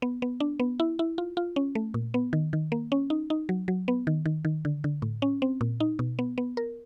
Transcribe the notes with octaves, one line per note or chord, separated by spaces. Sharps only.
B3
B3
D4
B3
E4
E4
F4
F4
C#4
A3
A#2
B3
D#3
D#3
A#3
C#4
D#4
D#4
F#3
F#3
B3
D#3
D#3
D#3
D3
D3
A2
C#4
C4
A#2
D#4
B2
B3
B3
A#4